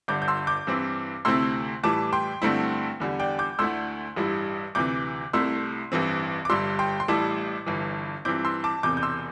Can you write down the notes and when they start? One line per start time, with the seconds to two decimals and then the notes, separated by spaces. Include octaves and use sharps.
0.08 G1 G2 D3 D6 G6
0.22 G6
0.28 C6 E6
0.47 D6 G6
0.67 G2 E3 C4 E4
1.25 D2 C3 A3 C4 E4 C6 E6
1.83 A2 E3 G3 E4 A5 D6
2.12 G5 C6
2.42 G2 D3 A3 C4 E4
3.00 E2 D3 G3
3.20 D5 G5
3.39 D6 G6
3.59 D2 D3 A3 E4 C6 E6
4.16 A1 G2 G3 E4
4.75 D2 C3 E3 D6 G6
5.33 C2 C3 A3 E4 C6 E6
5.92 A1 G2 E3 C4
6.45 D6
6.49 G1 G2 G3 C6 E6
6.79 G5 C6
7.00 C6
7.08 A1 A2 G3 E4 A5 D6
7.66 G1 G2 E3
8.25 G2 E3 C4 E4 D6 G6
8.45 C6 E6
8.64 A5 D6
8.83 E1 E2 C3 D6 G6
8.97 G6
9.03 C6 E6